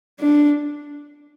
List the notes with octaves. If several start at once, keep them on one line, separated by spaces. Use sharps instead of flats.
D4